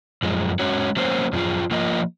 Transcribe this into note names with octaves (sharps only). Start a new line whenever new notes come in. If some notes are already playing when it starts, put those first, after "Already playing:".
F#2 F3 G#3
G#3 C#4 F#4 C#5
F#3 A#3 C#4 F#4 C5
F#2 F3 C4 F4 G#4
F3 A#3 F4 A#4 D#5